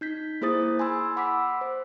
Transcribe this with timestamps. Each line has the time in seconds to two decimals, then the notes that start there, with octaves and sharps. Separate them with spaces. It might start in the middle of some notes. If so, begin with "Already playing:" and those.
0.01 D#4 G6 B6
0.41 A#3 E4 G#4 C5 D#6 A6
0.79 G#5 B5 C6 E6
1.16 F#5 B5 D6 E6 B6
1.61 C5